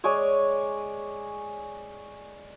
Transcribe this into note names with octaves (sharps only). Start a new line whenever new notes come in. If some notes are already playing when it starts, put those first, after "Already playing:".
G#3 C#5 D5 G#5